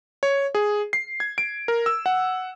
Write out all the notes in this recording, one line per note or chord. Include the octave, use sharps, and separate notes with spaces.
C#5
G#4
C7
G#6
D7
A#4
E6
F#5